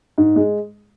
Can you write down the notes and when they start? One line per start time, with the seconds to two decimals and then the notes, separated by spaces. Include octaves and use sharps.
0.18 G#2
0.36 G#3